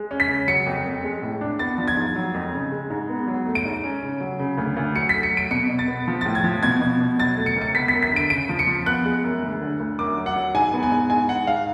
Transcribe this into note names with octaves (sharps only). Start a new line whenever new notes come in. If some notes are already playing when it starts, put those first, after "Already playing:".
Already playing: G#3
C#4
B6
C#3
F#3 C#7
F2
F2
G#3
A2
D4
B3 A6
F3
G#6
G#2
F#3
F2
C#3
G#3
G#2
B3
F#3
A3
D7
G#2
C#4
C#3
F#3
C#3
D2
D2
F#3 C#7
B6
A3
C#7
F#3 D7
B2 C#7
B2
A6
B3
F3
A2 A6
G#6
F3
B2 G#6
B2
B2
F#3 A6
A3
C#7
C#2
C#7
B3 B6
B6
F#2
B6
D3 D7
C#3 D7
F3
C#7
F3
B3 F#6
G#3
F#2
D2
D3
D2
F#2 D6
F#3
F#5
F#3
G#2 G#5
B3
G#5
G#2
G#2 G#5
G#2 F#5
G#2 F5